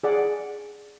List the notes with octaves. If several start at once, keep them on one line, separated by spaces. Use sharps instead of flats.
G#4 D5 F#5